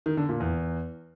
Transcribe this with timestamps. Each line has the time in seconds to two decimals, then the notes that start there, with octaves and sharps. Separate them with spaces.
0.06 D#3
0.17 D3
0.29 A#2
0.40 E2